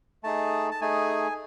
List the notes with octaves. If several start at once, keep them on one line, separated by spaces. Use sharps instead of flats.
A3 D#4 G#4 A5
A5
A3 D#4 G#4 G#5